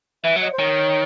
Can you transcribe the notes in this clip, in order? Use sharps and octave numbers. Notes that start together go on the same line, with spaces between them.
E3 E5
F#3
D#5
C5
D#3 C#5